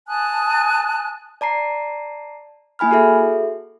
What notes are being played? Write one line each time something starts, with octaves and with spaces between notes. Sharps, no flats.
G#5 A5 D#6 F#6
D5 A5 A#5 C7
A#3 E4 G#5 B5 F6
F#4 G#4 A4 E5